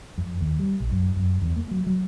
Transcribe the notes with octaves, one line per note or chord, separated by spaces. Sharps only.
F2
D#2
G3
A#1
F#2
F#2
E2
A#3
F#3
F#3